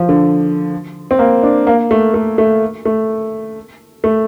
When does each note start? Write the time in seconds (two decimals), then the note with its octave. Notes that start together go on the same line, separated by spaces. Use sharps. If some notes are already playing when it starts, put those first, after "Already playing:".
Already playing: F3
0.09 D3
1.11 C4
1.19 A#3
1.43 D4
1.67 A#3
1.91 A3
2.14 A3
2.38 A3
2.85 A3
4.04 A3